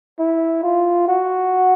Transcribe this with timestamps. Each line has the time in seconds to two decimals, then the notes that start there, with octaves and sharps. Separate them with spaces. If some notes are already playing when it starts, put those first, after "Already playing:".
0.19 E4
0.63 F4
1.08 F#4